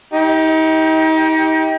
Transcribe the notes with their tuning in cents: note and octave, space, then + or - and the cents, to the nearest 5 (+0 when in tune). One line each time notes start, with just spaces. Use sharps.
D#4 +35 G4 +0